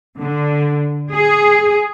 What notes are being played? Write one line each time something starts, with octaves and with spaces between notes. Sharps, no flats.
D3
G#4